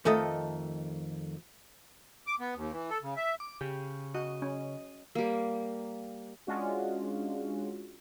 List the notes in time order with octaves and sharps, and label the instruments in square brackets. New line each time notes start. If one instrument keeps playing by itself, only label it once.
[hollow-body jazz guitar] F2 D#3 A3 A4 D#5
[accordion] D6
B3
D#2
E3
A4
C#3
E5
[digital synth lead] D6
[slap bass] C#3 [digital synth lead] G4
[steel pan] F#4 [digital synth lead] D#5
[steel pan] C#4
[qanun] G3 A#3
[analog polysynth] G#3 C#4 D4 F4 F#4